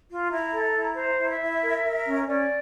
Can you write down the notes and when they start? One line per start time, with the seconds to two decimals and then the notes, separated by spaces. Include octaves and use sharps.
0.09 F4
0.30 E4 A#5
0.53 A4
0.75 E4
0.96 C5 A#5
1.18 E4
1.29 E5
1.40 E4
1.62 A#4
1.83 A#4
2.06 C#4
2.27 C#4 D5